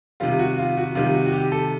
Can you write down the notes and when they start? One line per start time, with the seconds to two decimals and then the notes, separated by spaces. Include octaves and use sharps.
0.20 C3 D#3 G3 F4
0.39 F#4
0.58 F4
0.77 F#4
0.95 C3 D#3 G3 F4
1.14 F#4
1.26 F#4
1.33 G4
1.52 A4